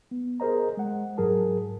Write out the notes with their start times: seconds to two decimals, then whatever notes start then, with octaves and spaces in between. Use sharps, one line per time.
0.11 B3
0.40 G#4 A#4 C5 D#5 A#5
0.77 G#3 F#5
1.18 G#2 F#3 G#4 A#4 A5